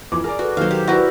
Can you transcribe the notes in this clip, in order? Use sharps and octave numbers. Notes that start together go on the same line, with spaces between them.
F2 E3 F3 D6
G#4 A#4 D5
F#4 A4 B4
D#3 F#3 C5 F5
G4
E4 F#4 A#4 B4 D5